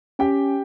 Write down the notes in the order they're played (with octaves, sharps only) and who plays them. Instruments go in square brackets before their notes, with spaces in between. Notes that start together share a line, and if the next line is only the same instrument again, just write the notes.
[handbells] C#4 [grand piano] G4 G5